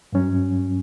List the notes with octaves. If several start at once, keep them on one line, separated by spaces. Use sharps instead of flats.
G2 F#3 C#4